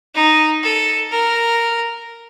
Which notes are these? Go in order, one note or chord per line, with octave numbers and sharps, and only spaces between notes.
D#4
A4
A#4